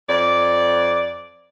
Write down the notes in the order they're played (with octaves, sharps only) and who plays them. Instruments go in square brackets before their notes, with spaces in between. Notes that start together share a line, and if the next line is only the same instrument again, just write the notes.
[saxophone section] F2 D5